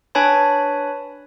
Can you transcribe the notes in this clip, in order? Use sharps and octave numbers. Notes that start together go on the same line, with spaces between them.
D4 B4 C#5 G#5 A5 B5